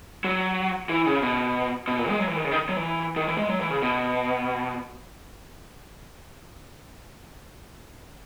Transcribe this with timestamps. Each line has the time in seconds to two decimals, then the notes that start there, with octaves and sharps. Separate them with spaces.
0.24 F#3
0.89 E3
1.07 C#3
1.22 B2
1.88 B2
1.98 A#2
2.09 G#3
2.19 F#3
2.28 E3
2.36 D#3
2.44 C#3
2.51 D#3
2.69 F#3
2.77 E3
3.16 D#3
3.28 E3
3.38 G#3
3.49 F#3
3.61 E3
3.70 C#3
3.82 B2